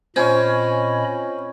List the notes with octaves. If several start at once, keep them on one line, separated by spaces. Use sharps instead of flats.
A#2 C4 C#4 F4 D#5 G#5 B5